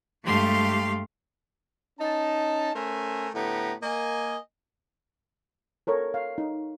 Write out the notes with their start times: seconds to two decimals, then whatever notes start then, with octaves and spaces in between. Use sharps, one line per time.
0.25 G2 G#3 A3 G4 F5 C6
1.99 C#4 D#4 A5
2.74 A3 C#4 A#4 C5 E5 G#5
3.34 A2 D3 A3 B3 G4 A#5
3.83 A#3 D#5 G#5
5.87 A4 A#4 C#5
6.14 F5
6.38 D#4